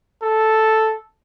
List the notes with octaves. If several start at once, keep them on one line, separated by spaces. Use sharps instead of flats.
A4